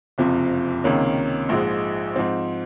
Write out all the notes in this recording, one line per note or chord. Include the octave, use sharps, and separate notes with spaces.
F#1 F2 C3 F3
C#2 C3 D#3 A#3 C#4
A#1 G#2 F3 G#3
G#2 F3 C4